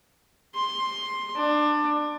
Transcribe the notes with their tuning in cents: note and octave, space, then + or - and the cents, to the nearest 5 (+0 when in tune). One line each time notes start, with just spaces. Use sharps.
C6 +10
D4 +20